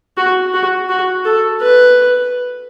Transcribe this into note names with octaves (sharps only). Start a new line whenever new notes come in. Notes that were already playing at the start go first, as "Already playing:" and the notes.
F#4
F#4
F#4
A4
B4